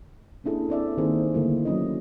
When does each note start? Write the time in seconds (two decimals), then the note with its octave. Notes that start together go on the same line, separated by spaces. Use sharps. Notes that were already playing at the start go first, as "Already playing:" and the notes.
0.44 A#3 C#4 D4 E4 G#4 A4
0.69 C4 A4 D5 E5
0.98 D#3 A#3 C4 D#4 G#4 C5
1.34 D3 G3 A3 A#3 D#4 E4
1.65 F#3 C#4 D#5